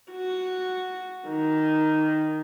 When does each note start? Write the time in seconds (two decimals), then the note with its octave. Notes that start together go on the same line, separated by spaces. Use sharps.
0.12 F#4
1.28 D#3